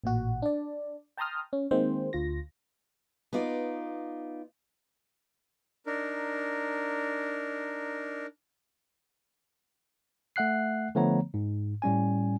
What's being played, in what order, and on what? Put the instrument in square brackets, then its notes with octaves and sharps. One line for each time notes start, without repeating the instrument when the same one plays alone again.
[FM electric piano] A1 A#2 F#4
D4 D5
G5 A5 A#5 C6 D#6 F6
C#4
D#3 G#3 A#3 C4 C5
D2 F4 A#6
[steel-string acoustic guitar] B3 D#4 F4 D5
[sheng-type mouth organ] D4 D#4 A#4
[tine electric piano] A3 E5 F#5 F#6 C7
D3 F3 A3 B3 C#5 A#5
G#2
A2 G3 C#4 G#5